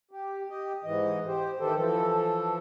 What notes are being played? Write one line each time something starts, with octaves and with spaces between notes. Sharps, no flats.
G4
G4 D#5
G#2 E3 D#5
G4 C5
D#3 E3 G4 A4 C5
E3 F3 A4